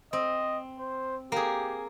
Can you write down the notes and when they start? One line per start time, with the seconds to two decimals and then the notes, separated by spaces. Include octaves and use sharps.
0.13 C4 D#5
0.79 C5
1.32 A#3 G4 G#4